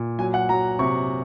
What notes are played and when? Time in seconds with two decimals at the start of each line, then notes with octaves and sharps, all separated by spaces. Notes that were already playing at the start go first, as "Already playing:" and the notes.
Already playing: A#2
0.19 F#3 G#5
0.34 F#5
0.49 F#3 A#5
0.79 C3 C#6